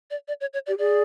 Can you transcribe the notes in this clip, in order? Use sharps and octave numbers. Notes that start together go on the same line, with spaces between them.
D5
D5
C#5
C#5
G4 D5
G#4 D5